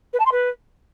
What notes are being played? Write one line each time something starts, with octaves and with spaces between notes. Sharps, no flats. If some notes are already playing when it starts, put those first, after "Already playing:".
B4
A5
C6
B4